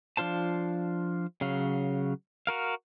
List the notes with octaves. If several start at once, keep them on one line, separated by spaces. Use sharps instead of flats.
F3 D4 F4 C5 A5
C#3 F#3 F5
F#4 A#4 F5